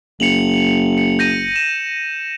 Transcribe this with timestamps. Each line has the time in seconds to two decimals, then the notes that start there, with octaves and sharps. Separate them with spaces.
0.20 F#1 C#7 F7 F#7
0.98 C#7
1.19 G6 A#6 D#7
1.56 E7